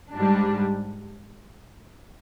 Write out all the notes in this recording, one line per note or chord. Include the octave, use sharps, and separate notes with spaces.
G#2 G3 D4